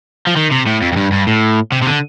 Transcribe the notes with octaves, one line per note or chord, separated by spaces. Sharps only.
F3
D#3
C3
A2
F2
F2
G2
G2
A2
C3
C3
D3